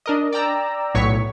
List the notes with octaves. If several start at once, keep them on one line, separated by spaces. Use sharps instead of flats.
D4 A#4 D#5
D5 G5 A#5 E6
B1 A2 F#3 C#5 C#6 B6